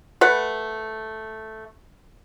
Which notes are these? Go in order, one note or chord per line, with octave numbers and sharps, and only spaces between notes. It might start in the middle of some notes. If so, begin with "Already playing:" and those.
A3 B4 F#5